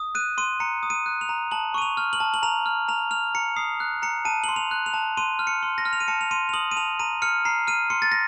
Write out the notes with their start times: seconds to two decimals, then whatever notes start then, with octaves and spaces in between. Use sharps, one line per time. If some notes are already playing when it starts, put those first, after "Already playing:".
Already playing: D#6
0.15 F#6 D#7
0.38 C6 D#7
0.60 A#5 C#7
0.83 D#6
0.90 D#7
1.06 F#6
1.21 F7
1.29 A#5
1.51 A5 F#7
1.74 C#6 D#7
1.82 F7
1.97 F6
2.13 F#7
2.20 A5
2.34 F#7
2.43 A#5 F7
2.66 F6
2.88 A#5 F7
3.11 F6 F7
3.35 A#5 C#7
3.56 D#6 C7
3.80 F#6
4.02 A#5 C#7
4.25 A5 D#7
4.44 C6 F#7
4.56 F7
4.71 F#6
4.86 F7
4.94 A5
5.17 C6 D#7
5.39 F6
5.47 C#7
5.63 C6
5.78 A#6
5.85 F6
5.93 F7
6.00 D#7
6.08 A5 C#7
6.21 F7
6.31 C6 D#7
6.49 F7
6.53 D#6 F#7
6.71 D#7
6.77 A5 F7
7.00 A#5 D#7
7.22 F6 C#7
7.45 A#5 C7
7.68 F6 D#7
7.90 C6 C#7
8.02 A6
8.12 A#6